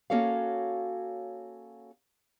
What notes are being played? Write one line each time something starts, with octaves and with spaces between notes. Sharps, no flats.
A#3 C#4 F#4 A4 C#5 F5